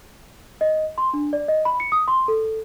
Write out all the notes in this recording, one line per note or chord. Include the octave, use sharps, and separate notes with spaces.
D#5
C6
D4
D5
D#5
B5
C#7
D#6
C6
A4